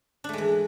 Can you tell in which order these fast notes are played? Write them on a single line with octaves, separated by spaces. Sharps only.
D4 A3 G#3 E3